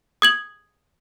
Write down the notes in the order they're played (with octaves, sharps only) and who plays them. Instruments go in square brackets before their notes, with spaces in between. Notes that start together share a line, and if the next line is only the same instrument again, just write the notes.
[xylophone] D#6 G#6 F#7